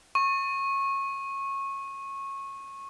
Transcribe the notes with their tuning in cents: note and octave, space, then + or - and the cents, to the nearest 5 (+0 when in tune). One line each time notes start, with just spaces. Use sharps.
C#6 -20